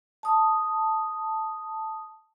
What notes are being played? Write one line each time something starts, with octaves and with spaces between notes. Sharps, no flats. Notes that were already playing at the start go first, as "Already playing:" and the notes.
A5 D#6